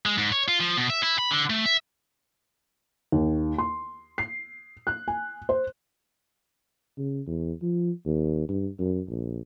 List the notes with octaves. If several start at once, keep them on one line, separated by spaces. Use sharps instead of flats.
G#3
G#2
C#5
F4
F3
B2
E5
E4
B5
D3
A3
E5
D#2
C6
C7
F#6
G#5
C5
C#3
E2
F3
D#2
G2
F#2
A#1